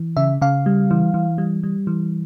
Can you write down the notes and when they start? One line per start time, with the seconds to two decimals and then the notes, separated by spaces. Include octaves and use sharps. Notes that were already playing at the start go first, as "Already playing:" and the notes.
Already playing: E3
0.17 C#3 E5
0.41 C#3 F5
0.66 G3
0.91 E3
1.14 E3
1.38 G3
1.63 G3
1.87 E3